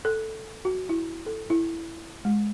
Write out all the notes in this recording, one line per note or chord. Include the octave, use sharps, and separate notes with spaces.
A4
F#4
E4
A4
E4
G#3